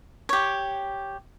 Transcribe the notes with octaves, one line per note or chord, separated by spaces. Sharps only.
G4 C#5